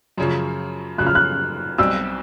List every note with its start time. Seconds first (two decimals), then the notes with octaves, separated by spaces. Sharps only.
0.18 F#2 C#3 F3
0.98 F#2 C#3 F3 F#6
1.07 F6
1.15 F#6
1.78 B1 B2 G3 C4 E6